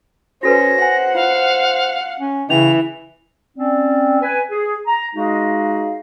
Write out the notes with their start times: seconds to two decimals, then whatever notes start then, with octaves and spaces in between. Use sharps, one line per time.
0.43 C#4 F#4 A4 B4 C5 A#6
0.82 F#5 G#5
1.15 F4 F5
2.20 C#4
2.50 C#3 E3 C#4 F7
3.57 C4 C#4 D5
4.22 B4 G#5
4.51 G#4
4.87 A#5
5.15 G#3 D#4 F#4 G#4 D#5 F5